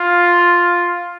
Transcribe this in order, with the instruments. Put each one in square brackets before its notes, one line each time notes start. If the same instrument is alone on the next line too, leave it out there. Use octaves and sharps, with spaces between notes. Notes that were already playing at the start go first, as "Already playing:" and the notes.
Already playing: [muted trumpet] F4